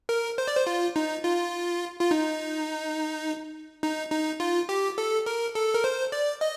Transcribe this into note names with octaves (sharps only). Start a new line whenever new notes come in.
A#4
C5
D5
C5
F4
D#4
F4
F4
D#4
D#4
D#4
F4
G4
A4
A#4
A4
A#4
C5
D5
D#5